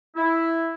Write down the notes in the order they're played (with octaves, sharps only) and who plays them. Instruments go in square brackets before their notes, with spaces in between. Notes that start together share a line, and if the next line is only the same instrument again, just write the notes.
[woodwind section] E4